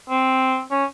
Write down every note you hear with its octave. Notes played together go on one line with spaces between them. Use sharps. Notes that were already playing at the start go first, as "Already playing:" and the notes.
C4
C#4